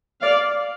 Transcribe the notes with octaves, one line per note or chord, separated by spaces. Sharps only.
D5 F5